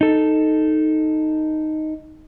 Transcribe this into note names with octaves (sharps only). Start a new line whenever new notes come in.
D#4 A4